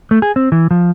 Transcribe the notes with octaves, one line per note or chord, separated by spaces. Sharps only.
A3
G#4
C4
E3
F3